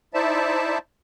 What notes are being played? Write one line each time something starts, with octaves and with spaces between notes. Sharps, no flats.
D#4 E4 C5 D5 E5 A5